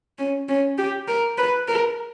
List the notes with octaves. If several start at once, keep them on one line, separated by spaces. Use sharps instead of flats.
C#4
C#4
G4
A#4
B4
A#4